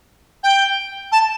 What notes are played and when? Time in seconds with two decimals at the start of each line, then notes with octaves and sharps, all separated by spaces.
0.43 G5
1.12 A5